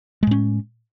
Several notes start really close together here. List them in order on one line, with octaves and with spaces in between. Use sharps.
G#3 A2 C#4